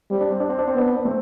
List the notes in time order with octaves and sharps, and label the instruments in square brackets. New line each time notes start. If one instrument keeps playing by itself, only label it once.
[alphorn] G3 [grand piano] C4
[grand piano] D4
C4
D4
C4
D4
C4
[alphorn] B3 [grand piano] D4
[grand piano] C4
D4
A3 C4